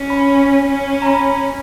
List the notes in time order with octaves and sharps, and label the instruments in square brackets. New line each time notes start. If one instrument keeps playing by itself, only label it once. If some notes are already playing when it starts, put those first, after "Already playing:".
Already playing: [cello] C#4
[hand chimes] B5
[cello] C#4
[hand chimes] A#5
B5